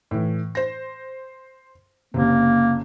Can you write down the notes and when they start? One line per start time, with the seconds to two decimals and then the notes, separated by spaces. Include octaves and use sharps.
0.11 A2 E3
0.55 C5 A#6
2.14 F#1 C3 A#3